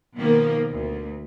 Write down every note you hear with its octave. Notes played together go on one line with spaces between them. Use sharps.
B2 D#3 F3 A#3
D2